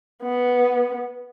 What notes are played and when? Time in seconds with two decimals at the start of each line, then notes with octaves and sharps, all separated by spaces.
0.23 B3